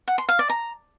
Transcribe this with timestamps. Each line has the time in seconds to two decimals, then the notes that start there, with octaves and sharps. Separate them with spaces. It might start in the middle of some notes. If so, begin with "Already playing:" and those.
0.08 F#5
0.18 C6
0.29 F5
0.39 D5
0.50 A#5